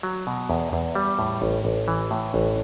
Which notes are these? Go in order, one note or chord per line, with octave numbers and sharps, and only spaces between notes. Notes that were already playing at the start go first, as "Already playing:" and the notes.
F#3
B2
E2
E2
G3
A2
A1
A1
E3
A2
A1